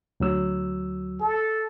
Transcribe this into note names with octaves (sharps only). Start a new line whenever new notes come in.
D2 F#3 E6
A4